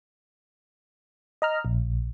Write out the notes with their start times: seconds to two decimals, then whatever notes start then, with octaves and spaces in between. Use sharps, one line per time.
1.42 D#5 A#5 F6
1.65 A#1